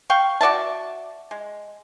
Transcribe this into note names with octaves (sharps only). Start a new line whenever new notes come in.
F5 G5 C#6
F#4 D5 E5 A5
G#3